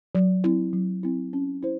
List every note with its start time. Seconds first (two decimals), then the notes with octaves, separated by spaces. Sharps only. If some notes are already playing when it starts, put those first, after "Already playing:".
0.15 F#3
0.44 C4 E4
0.73 F#3
1.03 C4 E4
1.33 C#4
1.63 E4 C5